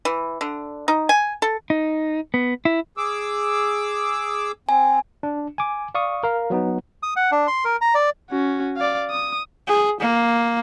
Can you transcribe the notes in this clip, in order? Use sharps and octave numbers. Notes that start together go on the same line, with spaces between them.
E3
D3
D#4
G#5
A4
D#4
B3
E4
G#4 D6 E6
C4 G#5
D4
G#5 D6
D5 F5 C#6 D#6
A#4 F5
F#3 B3 D#4
D#6
F#5
D4
C6
A#4
A#5
D5
C#4 F#4
D5 F5
D#6
G#4
A#3